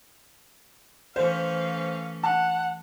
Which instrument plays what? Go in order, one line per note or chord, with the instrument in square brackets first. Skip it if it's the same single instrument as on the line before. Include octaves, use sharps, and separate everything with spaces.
[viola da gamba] E3 A3 C#4 [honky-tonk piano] C5 [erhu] F5
[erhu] F#5 [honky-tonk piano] A5